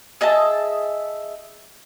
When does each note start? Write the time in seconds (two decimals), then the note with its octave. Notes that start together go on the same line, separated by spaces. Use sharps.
0.21 G#4 D#5 E5 A5